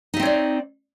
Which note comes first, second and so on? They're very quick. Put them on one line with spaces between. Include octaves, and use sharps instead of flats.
D#4 E5 C4 C#5 D5